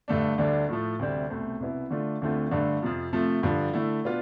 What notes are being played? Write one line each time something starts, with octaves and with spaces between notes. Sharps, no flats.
G2 D3 A3 D4
D2 D3 G3 D4
A2 F3 A3
D2 C3 G3 C4
C2 B2 A3 C4
C2 B2 B3 E4
D3 A3 D4 F4
D2 D3 A3 C4 F4
G2 D3 A3 D4
F2 C3 F3
C3 F3 A3
G2 D3 F3
D3 A3 E4
B2 B3 D4 F4